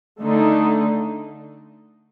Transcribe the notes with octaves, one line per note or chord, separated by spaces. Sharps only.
D3 A3 D#4